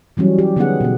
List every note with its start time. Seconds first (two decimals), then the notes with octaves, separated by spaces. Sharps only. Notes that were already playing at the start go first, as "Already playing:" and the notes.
0.17 E3 F#3 G3 C#4
0.39 G4
0.56 D3 B3 C#4 D#4 G#4 F#5
0.81 B2 B3